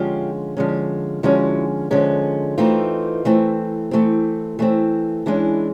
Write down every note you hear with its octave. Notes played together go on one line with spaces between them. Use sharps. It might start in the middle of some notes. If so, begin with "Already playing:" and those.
Already playing: D3 F3 G#3 C#4 F4 G4
D3 F3 G#3 C#4
D3 F3 G#3 C#4 E4 F#4
D3 F3 G#3 C#4
E3 A3 C4 D#4 F4
E3 A3 C4
E3 A3 C4
E3 A3 C4
E3 G#3 C#4 D4 E4